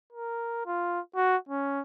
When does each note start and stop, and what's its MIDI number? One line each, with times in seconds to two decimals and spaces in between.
0.13 0.66 70
0.66 1.00 65
1.16 1.36 66
1.49 1.82 61